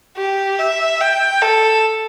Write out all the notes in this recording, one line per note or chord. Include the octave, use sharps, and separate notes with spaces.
G4
E5
G5
A4